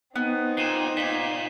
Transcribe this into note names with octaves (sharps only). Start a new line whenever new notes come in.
B3 C4 D#4
A#2 C7 D#7 E7
A#2 B6 E7